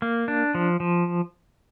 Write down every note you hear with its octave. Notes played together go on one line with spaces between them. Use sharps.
A#3
D4
F3
F3